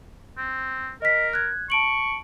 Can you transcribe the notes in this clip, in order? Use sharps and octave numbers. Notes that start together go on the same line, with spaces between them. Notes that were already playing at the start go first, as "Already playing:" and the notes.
C4
A#4 D#5 B6
F#6 G#6
A5 C#6 D7 F#7